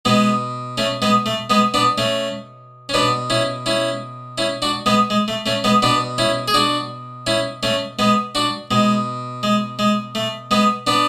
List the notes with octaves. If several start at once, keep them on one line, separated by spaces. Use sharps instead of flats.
B2 G#3 B3
A3 C#4
G#3 B3
A3
G#3 B3
B3 D4
A3 C#4
C#4
B2 B3 D4
C#4 E4
C#4 E4
C#4 E4
D4 F#4
G#3 B3
G#3
A3
A3 C#4
G#3 B3
B2 B3 D4
C#4 E4
G#4
D4 F#4
C#4 E4
A3 C#4
G#3 B3
D4 F#4
B2 G#3
G#3
G#3
A3
G#3 B3
B3 D4